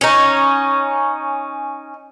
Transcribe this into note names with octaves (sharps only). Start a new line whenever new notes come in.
C#4 D#4